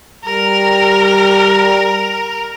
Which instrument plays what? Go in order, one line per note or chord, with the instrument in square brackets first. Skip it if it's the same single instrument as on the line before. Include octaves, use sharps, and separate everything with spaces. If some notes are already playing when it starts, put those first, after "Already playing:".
[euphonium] G3 [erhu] A#4